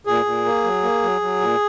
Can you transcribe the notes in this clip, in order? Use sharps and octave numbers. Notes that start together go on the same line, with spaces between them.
A#2 G#4
A#2
A#3
F#3
A#3
F#3
F#3
A#2